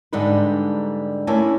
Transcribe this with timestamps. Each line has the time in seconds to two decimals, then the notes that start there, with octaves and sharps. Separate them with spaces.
0.13 G#2 D3 G3 D4 D#4 B4
1.27 A3 A#3 C#4 E4 G#5 A5